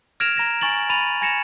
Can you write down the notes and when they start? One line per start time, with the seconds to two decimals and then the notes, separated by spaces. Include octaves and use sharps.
0.20 F6 G#6 A#6 D7 E7 F7
0.36 A#5 A#6 E7
0.61 G#5 C#6 A6 F#7
0.89 B5 A6 D#7 F7
1.22 G#5 G#6 A#6 C#7 E7 F7